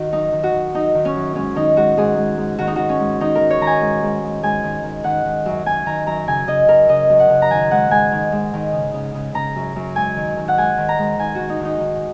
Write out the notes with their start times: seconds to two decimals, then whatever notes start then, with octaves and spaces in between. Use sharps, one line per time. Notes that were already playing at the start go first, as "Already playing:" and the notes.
Already playing: D#3 F#4
0.12 F#2 D#4
0.33 D#3
0.43 F#4
0.53 D#3
0.74 F#2 D#4
0.95 D#3
1.05 C#4
1.16 F#2
1.35 G#2 C#4
1.56 D#3 D#4
1.76 G#2 F#4
1.97 G#2 G#4
2.18 G#2
2.38 G#2
2.58 D#3 F#4
2.67 D#4
2.76 D#3 F#4
2.89 C#4
3.00 G#2
3.20 D#3 D#4
3.35 A#4
3.41 D#3
3.50 C#5
3.61 D#3 A#5
3.67 G#5
3.81 G#2
4.03 G#2
4.23 G#2
4.43 G#2 G#5
4.64 D#3
4.84 D#3
5.04 D#3 F#5
5.25 D#3
5.46 F#2
5.66 F#2 G#5
5.86 D#3 A#5
6.06 F#2 A#5
6.27 C#3 G#5
6.47 C#3 D#5
6.68 C#3 A#4
6.89 C#3 D#5
7.09 F#2
7.20 F#5
7.30 C#3
7.42 A#5
7.50 D#3 G#5
7.71 G#2 F#5
7.91 G#2 G#5
8.12 D#3
8.32 G#2
8.53 D#3
8.73 C#3
8.94 C#3
9.14 C#3
9.34 C#3 A#5
9.55 F#2
9.76 F#2
9.96 G#2 G#5
10.16 D#3
10.37 D#3
10.48 F#5
10.58 G#2 G#5
10.78 D#3
10.89 A#5
10.98 G#2
11.19 D#3 G#5
11.35 D#3 F#4
11.49 D#4
11.60 D#3 D#4
11.80 D#3